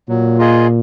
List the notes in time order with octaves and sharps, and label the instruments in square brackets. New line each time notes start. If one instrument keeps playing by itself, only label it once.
[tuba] A#2 [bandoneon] F#3
[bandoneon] A#3 F4 G#4 D#5